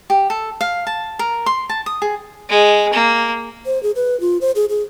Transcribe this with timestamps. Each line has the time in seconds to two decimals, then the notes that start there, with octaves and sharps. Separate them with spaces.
0.10 G4
0.30 A4
0.61 F5
0.87 A5
1.19 A#4
1.46 C6
1.69 A5
1.86 D#6
2.02 G#4
2.49 G#3
2.93 A#3
3.66 C5
3.83 G#4
3.96 B4
4.20 F4
4.41 C5
4.55 G#4
4.69 G#4